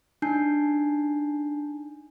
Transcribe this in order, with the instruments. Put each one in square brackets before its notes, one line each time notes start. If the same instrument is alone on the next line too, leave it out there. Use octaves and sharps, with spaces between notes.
[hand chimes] D4 D#4 G#5 A5 G6 C7